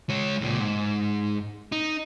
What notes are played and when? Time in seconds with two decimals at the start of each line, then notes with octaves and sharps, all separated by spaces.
0.10 G#3 C#5
0.41 C#2 A#2
0.59 G#2
1.72 D#4